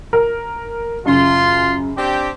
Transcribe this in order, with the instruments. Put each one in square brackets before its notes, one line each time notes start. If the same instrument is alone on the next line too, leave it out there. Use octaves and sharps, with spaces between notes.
[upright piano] A#4
[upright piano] F#2 C#3 [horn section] F4 C6
[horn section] C4 D4 G4